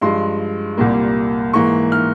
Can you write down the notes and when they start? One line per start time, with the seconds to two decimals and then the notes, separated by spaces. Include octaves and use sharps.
0.02 G2 F3 G#3 C6
0.77 C2 A#2 G3 A#3
1.53 G#2 E3 A#3 C#6
1.92 F6